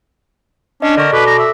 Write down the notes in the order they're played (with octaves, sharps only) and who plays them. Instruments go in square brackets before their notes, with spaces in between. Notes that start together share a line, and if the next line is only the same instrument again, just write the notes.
[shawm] C#4 [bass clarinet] D4 [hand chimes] D#5
[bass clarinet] D3 [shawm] A#4 [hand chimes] D5 C#6
[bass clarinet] B2 [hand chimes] A4 D6 [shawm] B4
[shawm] A#5
E5